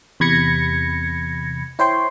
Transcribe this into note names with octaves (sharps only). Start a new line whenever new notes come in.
E2 C3 B5 G#6 A#6 C#7
E4 C5 C#5 G5 C6